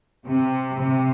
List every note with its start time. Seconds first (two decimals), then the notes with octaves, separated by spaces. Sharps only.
0.24 C3
0.78 C3